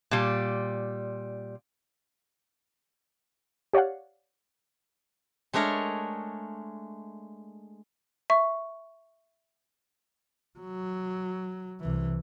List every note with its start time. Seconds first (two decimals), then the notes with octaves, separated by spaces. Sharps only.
0.11 A#2 G3
3.73 G4 C#5 D5 F5 F#5
5.54 G#3 A3 D4 A#4 C#5
8.30 E5 C#6
10.59 F#3
11.81 C2 E3